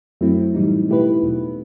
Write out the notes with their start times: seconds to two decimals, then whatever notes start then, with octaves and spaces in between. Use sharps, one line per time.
0.21 F#2 F#3 A3 C4 E4
0.55 A2 E3 G3 D#4
0.89 B2 A3 E4 G4 B4
1.22 E2 B2 F#3 B3